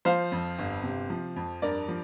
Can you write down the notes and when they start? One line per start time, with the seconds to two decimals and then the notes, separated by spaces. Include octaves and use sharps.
0.05 F3 C5 F5
0.32 F2
0.59 G1
0.84 C3
1.10 F3
1.36 F2
1.62 G2 A#4 D5
1.88 F3